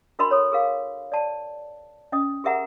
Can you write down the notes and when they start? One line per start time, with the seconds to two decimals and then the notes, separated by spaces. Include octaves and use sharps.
0.19 D4 F#4 A#4 D#5 B5 C6
0.31 A4 C#5
0.52 G#4 A#4 F5
1.12 D5 A5
2.12 C#4 D#5 D#6
2.44 G4 G#4 A#4 E5 F#5 A#5